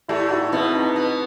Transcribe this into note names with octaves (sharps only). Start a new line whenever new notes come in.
A2 A3 E4 G4
D#4 F#4
B2 B3 C4 E4
D#4
B2 B3